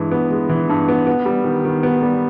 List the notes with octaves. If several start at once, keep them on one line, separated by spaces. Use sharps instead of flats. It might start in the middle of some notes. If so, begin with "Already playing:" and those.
Already playing: G2 E3 G#3
B3
G#3
E3
G2
B3
B3
G3
D#3
D#3
B3
G3